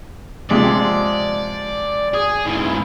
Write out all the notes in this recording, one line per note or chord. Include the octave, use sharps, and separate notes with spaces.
C3 F3 G#3 D5
G#4
G#2 E3